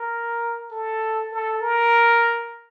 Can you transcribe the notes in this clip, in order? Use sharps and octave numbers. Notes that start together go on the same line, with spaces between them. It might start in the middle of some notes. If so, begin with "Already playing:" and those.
Already playing: A#4
A4
A4
A#4